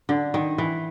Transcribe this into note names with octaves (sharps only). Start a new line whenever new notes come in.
D3
D#3
E3